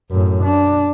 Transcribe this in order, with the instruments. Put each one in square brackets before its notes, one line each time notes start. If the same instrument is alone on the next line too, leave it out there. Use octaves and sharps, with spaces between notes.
[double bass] F#2 A2
D4